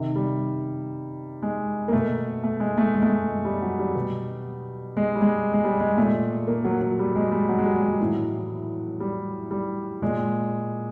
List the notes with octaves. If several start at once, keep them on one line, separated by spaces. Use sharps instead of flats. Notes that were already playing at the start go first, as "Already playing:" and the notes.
Already playing: C3 D#3
G3
G#3
A#3
B2 A3
A3
G#3
A3
G#3
A3
G#3
G3
F#3
G3
B2
G#3
G3
G#3
G#3
G3
G#3
A#2 A3
A#3
F#3
F#3
G3
G#3
G3
F#3
G#3
G3
F#3
A2 E3
G3
G3
A#2 G#3